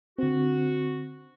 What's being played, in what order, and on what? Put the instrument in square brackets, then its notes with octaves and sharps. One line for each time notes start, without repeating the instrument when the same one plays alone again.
[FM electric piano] D3 C4 [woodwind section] F#4